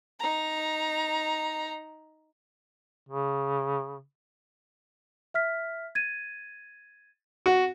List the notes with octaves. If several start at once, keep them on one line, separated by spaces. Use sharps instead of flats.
D#4 A#5
C#3
E5 F6 B6
G#6 A6 D#7
F#4